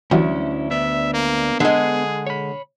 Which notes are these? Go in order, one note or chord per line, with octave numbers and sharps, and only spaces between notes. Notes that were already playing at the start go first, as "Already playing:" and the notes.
D2 E3 F#3 G3 C#4 E4
B3 D4 E5
A#3
D3 G#3 G#4
C#5 B5